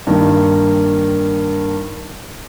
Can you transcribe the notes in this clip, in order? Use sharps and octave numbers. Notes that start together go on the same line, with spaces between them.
G2 D#3 A#3